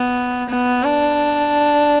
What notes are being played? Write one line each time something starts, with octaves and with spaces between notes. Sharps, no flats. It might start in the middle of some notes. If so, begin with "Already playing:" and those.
Already playing: B3
B3
D4